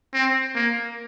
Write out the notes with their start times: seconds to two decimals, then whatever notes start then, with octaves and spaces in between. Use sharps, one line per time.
0.14 C4
0.55 A#3